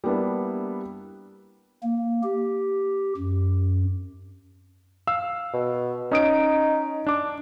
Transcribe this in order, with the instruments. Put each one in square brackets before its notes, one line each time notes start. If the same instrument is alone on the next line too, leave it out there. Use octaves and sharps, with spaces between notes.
[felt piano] G3 A#3 B3 D4 E4
[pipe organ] A#3
G4
F#2
[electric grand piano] F5 E6
[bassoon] B2
[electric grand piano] C#4 D#6 D7 [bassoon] D#4
[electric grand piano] D4 D6